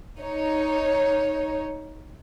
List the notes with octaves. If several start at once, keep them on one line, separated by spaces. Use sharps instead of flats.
D#4 C#5